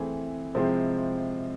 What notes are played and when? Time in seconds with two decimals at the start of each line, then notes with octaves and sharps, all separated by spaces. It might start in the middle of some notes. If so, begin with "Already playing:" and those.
Already playing: E3 A3 C4 E4 G#4
0.55 C3 F3 G#3 C4 E4